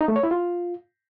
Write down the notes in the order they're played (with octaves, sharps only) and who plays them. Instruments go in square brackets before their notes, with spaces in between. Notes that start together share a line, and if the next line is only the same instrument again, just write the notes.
[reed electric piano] D#4
A3
C#5
E4
F4